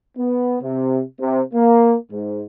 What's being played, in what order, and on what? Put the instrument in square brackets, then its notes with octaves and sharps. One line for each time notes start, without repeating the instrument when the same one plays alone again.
[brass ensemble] B3
C3
C3
A#3
G#2